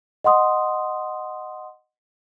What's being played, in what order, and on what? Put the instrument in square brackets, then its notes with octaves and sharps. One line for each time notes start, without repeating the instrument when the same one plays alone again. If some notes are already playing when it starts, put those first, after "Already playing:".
[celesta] D#5 F#5 C6 D#6